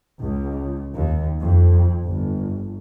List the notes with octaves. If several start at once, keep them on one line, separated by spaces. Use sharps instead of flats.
C#2
D#2
F2
G1